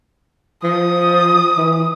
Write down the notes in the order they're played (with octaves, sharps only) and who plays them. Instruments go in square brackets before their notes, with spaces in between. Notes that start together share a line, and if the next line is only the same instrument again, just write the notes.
[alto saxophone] F3 [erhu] D#6
[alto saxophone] E3